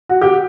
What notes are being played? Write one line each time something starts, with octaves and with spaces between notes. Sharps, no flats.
F#4
G4